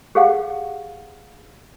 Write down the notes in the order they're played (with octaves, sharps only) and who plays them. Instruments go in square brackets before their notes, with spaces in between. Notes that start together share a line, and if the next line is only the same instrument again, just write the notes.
[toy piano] G4 G#4 F5 F#5